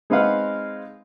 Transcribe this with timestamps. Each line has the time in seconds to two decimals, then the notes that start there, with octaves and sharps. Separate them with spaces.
0.10 G#3 C4 D#4 B4 F5 F#5